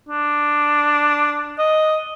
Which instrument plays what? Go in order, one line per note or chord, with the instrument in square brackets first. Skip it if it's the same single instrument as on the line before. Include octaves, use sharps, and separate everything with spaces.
[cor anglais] D4
D#5